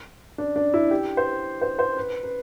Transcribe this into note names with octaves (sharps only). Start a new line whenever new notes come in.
D4
D4
E4
G4
C5
C5
C5
B4
B4